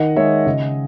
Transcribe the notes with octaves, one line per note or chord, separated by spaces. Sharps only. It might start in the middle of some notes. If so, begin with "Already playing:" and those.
Already playing: D#3 D#5 F#5
G#3 D#4 C#5 E5
C#3 D#5